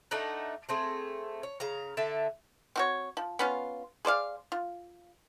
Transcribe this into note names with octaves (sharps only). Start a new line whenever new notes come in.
A3 D4 D#4 F#5
A3 C4 G#4
C#5
C#3 F5 A#5
D3 E5 A5
C4 F#4 C#5
F3
B3 C#4 F4
G#4 C5 D5 F5
F4